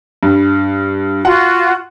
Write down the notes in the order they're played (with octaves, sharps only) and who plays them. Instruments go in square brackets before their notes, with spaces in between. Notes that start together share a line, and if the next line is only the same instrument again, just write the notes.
[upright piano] G2
[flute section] F4 F#4 [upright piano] F#5